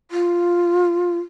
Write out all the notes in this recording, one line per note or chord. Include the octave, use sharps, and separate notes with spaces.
F4